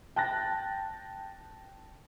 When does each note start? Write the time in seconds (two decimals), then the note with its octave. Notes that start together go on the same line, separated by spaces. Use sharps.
0.16 G5 A5 F#6 A6 A#6